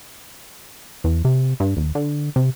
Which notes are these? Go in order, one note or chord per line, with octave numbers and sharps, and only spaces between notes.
E2
C3
G2
D#1
D3
C3